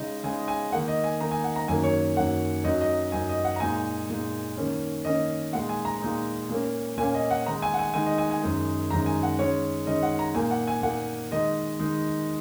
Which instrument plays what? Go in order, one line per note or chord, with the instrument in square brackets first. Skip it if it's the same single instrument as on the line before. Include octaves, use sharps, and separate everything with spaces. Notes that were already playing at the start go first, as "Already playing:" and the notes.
Already playing: [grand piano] C#3 G#3 D#4 D#5
C#3 G#3 D#4 G#5
G#5
D#3 A#3 D#4 F#5
D#5
G#5
D#3 A#3 D#4 A#5
G#5
F#5
A#5
F#2 D#3 F#3 A#3 G#5
C#5
F#2 D#3 F#3 A#3 F#5
F#2 F#3 D#4 D#5
D#5
F#2 F#3 D#4 G#5
D#5
F#5
A#5
A#2 G#3 D#4 G#5
A#2 G#3 D#4
D#3 A#3 C#4
D#3 A#3 C#4 D#5
A#2 G#3 D#4 F#5
G#5
A#5
A#2 G#3 D#4
A#2 A#3 C#4
A#2 A#3 C#4 G#5
D#5
F#5
D#3 G#3 D#4 A#5
G#5
F#5
G#5
D#3 G#3 D#4 G#5
D#5
G#5
G#5
F#2 D#3 G#3 D#4
F#2 D#3 G#3 D#4 A#5
G#5
F#5
D#3 G#3 C#4 C#5
D#3 G#3 C#4 D#5
F#5
A#5
A#2 A#3 D#4 G#5
F#5
G#5
A#2 A#3 D#4 F#5
D#3 G#3 D#4 D#5
D#3 G#3 D#4